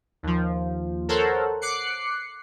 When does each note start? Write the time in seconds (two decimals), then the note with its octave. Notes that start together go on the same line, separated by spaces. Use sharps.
0.23 D#2 F3
1.09 A4 A#4 C5 C#5 F#5
1.61 D6 F#6 C7 C#7